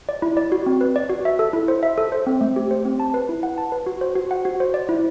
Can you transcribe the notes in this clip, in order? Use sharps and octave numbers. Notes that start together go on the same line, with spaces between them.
D5
E4
D5
F#4
C4
B4
D5
F#4
E5
A4
E4
C5
E5
A4
C5
C4
A3
G4
C5
C4
A5
B4
E4
F#5
A5
B4
F#4
C5
F#4
F#5
F#4
C5
D5
E4